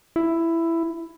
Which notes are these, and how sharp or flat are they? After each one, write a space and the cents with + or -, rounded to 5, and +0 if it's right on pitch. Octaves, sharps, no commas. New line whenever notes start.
E4 +10